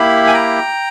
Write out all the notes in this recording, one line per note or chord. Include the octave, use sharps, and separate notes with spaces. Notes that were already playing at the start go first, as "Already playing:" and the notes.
Already playing: A#3 E4 G4 B5
G#5
G5 A#5